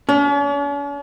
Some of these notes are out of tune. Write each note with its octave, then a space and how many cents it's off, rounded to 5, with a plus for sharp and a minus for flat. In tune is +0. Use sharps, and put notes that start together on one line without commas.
C#4 +45